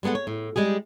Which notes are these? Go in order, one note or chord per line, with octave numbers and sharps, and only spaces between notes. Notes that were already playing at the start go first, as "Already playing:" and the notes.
G3 G#3 B3 A4 F#5
C#5
A2
G3 G#3 G4 G#4